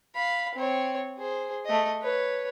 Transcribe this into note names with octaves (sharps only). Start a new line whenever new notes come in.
F5 B5
C4 C#5
G#4 C5
A3 D#5
B4 C#5